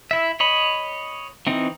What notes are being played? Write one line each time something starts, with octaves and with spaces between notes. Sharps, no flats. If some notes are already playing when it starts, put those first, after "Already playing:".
E4 E5
C#5 D#5 B5
E3 C4 D#4